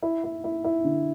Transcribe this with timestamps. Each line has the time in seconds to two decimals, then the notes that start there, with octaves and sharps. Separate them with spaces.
0.02 E4
0.24 E4
0.44 E4
0.64 E4
0.84 D3